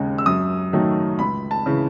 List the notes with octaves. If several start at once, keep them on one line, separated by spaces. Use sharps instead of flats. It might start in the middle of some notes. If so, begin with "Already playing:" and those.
Already playing: D#2 C#3 G#3
E6
F#2 D#6
D#3 F#3 A3
C#2 B5
A5
C#3 E3